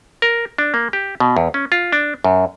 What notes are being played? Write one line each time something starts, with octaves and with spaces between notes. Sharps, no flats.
A#4
D4
A#3
G4
B2
E2
C#4
F4
D4
F#2